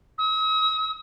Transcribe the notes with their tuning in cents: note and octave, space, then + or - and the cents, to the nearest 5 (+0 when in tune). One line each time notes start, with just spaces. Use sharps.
D#6 +45